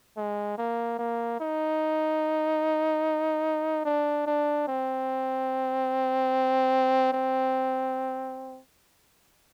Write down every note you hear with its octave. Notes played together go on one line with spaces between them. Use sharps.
G#3
A#3
A#3
D#4
D4
D4
C4
C4